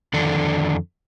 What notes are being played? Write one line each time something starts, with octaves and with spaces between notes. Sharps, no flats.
F2 D3 D#3 A4 D5